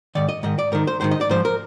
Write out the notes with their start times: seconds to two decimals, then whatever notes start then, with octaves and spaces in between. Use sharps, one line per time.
0.15 G#2 D#3 D5
0.29 D#5
0.43 G#2 D#3 D#5
0.59 D5
0.72 G#2 D#3 A#4
0.87 C5
1.01 G#2 D#3 C5
1.11 D#5
1.21 D5
1.29 G#2 F3 C5
1.45 A#4